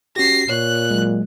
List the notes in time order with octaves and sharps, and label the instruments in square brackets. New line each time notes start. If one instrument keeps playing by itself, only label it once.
[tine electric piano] C#4 F#4 G4 [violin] A#6 C7
[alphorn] A#2 [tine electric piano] C#5 [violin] F#6
[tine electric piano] F#3 G#3